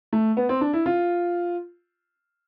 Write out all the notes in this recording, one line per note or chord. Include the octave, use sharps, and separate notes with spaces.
A3
B3
C4
D4
E4
F4